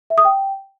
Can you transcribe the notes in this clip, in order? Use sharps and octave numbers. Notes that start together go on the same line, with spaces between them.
E5
D#6
G5